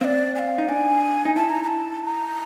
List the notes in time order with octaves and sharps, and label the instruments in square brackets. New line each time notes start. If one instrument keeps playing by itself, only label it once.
[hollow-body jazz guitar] C4 [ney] D5 F5
[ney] G#5
F5
[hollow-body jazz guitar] D#4
[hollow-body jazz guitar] D4 [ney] G#5
[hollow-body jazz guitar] D#4
[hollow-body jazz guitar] E4 [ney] A5
[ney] A#5
A#5
A5
A#5